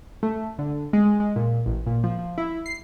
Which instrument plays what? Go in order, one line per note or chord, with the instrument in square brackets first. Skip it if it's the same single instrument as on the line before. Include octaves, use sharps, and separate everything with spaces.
[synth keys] A3
D3
G#3
G#3
A#2
A1
A#2
F3
F3
E4
C7